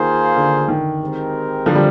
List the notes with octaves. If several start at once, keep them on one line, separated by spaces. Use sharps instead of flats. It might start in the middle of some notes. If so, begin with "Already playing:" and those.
Already playing: D#3 A#3 F4 G#4 C5
D3
D#3
G#3 C4 G4 A#4
D3 F3
G3